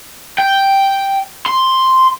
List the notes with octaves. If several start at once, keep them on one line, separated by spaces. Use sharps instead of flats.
G5
C6